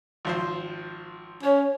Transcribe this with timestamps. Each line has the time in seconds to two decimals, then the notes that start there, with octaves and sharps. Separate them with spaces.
0.25 G#1 F3 C5
1.43 C#4 C#5